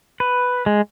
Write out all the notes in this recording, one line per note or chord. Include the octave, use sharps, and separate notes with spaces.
B4
G#3